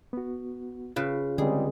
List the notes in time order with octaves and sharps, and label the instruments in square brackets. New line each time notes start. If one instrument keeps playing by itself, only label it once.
[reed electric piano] B3 F#4
[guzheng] C#3 B4 [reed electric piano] F4
[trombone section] C#2 G3 G#3 [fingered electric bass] D3 C4 [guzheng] G#4